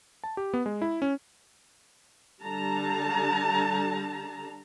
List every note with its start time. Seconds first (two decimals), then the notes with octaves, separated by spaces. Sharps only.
0.24 A5
0.37 G4
0.54 B3
0.66 G#3
0.82 E4
1.02 C#4
2.41 D3 G3 A5 A#5